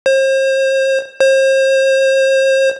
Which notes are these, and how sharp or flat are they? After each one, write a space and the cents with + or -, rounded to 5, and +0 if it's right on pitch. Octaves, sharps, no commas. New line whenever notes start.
C5 +40
C5 +40